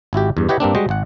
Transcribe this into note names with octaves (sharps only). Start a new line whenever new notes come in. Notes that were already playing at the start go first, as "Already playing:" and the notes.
G#1 E4 F#4 G4
E2 G2
E4 G4 B4 C#5 D#5 F#5
G2 A#3 C4 D4
G3 G#3 F#4 C5 D#5
G#1 F#5